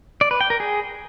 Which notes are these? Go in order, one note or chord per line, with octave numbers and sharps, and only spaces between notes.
D5
B4
G5
A#4
G#4